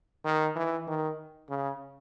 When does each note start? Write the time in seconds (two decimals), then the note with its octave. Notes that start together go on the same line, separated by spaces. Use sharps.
0.25 D#3
0.56 E3
0.87 D#3
1.49 C#3